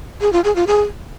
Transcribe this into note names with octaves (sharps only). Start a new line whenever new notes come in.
G#4
F4
G#4
F4
G#4